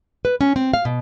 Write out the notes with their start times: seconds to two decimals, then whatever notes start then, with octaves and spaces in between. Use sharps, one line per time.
0.25 B4
0.41 C#4
0.56 C4
0.73 F5
0.85 B2